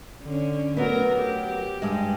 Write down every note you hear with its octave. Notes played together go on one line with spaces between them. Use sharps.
D3 C#4
F#3 A3 B3 A#4
G4
G2 G#3